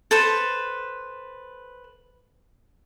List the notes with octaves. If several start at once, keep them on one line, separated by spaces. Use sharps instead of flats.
A4 B4 C5